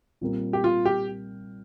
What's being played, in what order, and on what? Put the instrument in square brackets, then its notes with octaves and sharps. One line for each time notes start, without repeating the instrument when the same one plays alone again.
[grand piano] A#2 G3 C4 A#4
[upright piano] G4
F4
G4